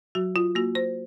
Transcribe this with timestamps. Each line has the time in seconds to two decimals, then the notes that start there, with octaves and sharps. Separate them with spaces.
0.15 F#3 F#4
0.36 F4
0.55 A#3 F#4
0.75 C5